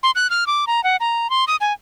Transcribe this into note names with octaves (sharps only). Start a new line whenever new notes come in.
C6
F#6
F6
D6
A#5
F#5
A#5
C6
D#6
G#5